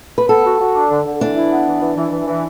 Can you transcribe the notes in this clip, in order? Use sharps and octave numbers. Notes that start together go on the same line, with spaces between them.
B4
B3 A4
F#4
F#4
D4
D3
D3
E3 D4
E4
B3
E3
E3
E3
E3
E3